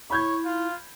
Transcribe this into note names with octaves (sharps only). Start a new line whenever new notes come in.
E4 C#5 B5 G6 G#6
F4